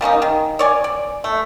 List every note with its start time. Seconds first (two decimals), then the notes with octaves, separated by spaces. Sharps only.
0.01 G3 A#3 C#4 D#4
0.22 D#3
0.59 C#5 D5 G#5
0.84 D5
1.24 A3